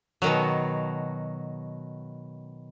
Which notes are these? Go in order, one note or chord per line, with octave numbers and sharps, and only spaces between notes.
B2 D#3 F#3